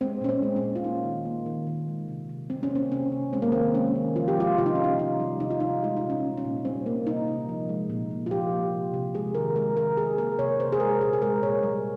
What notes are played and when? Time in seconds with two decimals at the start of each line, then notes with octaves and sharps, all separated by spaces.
0.01 G#3 C4
0.21 A#2 C#4
0.29 C4
0.42 G#3
0.56 C#4
0.64 A#2
0.76 F4
0.84 A#3 D#4
1.04 D#3
1.25 A#3
1.46 D#3
1.67 D#3
1.88 G#3
2.08 C3
2.29 C3
2.50 G3 C4
2.63 C#4
2.71 A#3 C4
2.91 C3 C#4
3.12 C3
3.33 G#3 C4
3.42 A#3
3.52 D#3 C4
3.75 G#3 C#4
3.96 D#3
4.16 F3 F4
4.28 G4
4.37 G#3 F4
4.58 C3 F4
4.66 D#4
4.75 C3 C#4
4.84 D#4
4.99 D#3 D#4
5.20 G3
5.40 C3 D#4
5.50 F4
5.60 C3 D#4
5.82 G#3 F4
5.97 D#4
6.03 A#2
6.10 C#4
6.24 G#3
6.37 C#4
6.45 A#2
6.65 G3 C4
6.86 A#3
7.07 C3 D#4
7.28 C3
7.49 F3
7.69 G#3
7.90 A#2
8.11 A#2
8.26 F4
8.31 F3 G4
8.52 A#3
8.73 C3
8.94 C3
9.14 G#3 G#4
9.35 D#3 A#4
9.55 G#3 A#4
9.76 D#3 A#4
9.97 F3 G#4
10.18 A#3 A#4
10.39 C3 C#5
10.60 C3 C5
10.72 G#4
10.80 G#3 A#4
11.01 A#2 G#4
11.13 G#4
11.22 G#3 A#4
11.43 A#2 C#5
11.63 G3